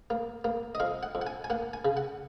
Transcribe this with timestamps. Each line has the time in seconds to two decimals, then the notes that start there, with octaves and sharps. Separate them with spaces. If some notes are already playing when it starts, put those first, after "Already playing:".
0.10 A#3
0.44 A#3
0.75 D#5
0.80 F2 F5
1.03 F#5
1.15 F2
1.22 F#5
1.27 G#5
1.44 G#5
1.50 A#3 F#5
1.73 G#5
1.85 C#3
1.97 F#5